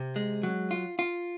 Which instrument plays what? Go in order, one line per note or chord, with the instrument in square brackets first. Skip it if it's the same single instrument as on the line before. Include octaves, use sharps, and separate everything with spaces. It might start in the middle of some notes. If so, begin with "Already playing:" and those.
Already playing: [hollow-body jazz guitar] C3
G#3
F#3
F4
F4